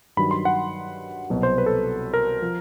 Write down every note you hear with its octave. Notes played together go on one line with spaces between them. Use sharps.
G2 D#3 F#3 B5
C6
F#5
C2 B2 F#3
C5
B4
A4
A#4
F3